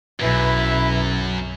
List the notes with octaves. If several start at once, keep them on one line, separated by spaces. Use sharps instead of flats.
B1 F#2 E4 B4